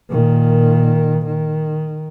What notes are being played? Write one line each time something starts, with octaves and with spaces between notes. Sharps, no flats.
A#2 D#3
D#3